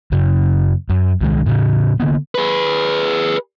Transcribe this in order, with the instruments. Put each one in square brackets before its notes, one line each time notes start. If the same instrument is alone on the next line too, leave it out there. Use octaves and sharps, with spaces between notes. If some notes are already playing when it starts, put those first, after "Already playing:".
[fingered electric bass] F#2 C#3
F#2
C2 D#3 G#3
A2 C#3
D3 A#3 B3
[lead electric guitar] G#4 B4